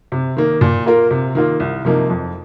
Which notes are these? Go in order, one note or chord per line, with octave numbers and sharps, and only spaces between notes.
C3
D#3 A#3
A#2
A#3 F4 A#4
C3
D#3 A#3 F4
C2
C3 F3 A#3 D#4
F2